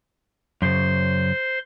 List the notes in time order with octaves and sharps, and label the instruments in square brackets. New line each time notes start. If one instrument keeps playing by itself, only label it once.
[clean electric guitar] F#2 C#3 [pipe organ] C5 C6